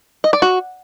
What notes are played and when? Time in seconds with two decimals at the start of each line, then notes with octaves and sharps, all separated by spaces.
0.24 D#5
0.33 D5
0.42 F#4